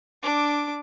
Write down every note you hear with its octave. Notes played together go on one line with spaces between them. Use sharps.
D4 D6